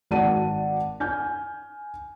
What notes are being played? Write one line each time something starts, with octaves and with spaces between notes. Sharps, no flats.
G#1 F#4 D5 F#5 A5 D#7
G#5 F6 G6